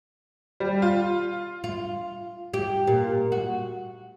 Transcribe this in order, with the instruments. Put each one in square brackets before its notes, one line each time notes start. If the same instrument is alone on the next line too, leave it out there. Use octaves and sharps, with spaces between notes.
[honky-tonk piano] G3
F4
[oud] F4
G4
A#2
F#4